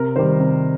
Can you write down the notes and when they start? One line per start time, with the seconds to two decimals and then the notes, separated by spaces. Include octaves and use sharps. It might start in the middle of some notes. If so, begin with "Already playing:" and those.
Already playing: C3 A#4
0.16 D#3 G3 C5
0.40 C3